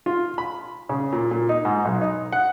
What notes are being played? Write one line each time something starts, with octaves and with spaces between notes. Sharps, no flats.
F4
B5
C#3
A#2
A#2
D#4
G#2
B1
D#4
F#5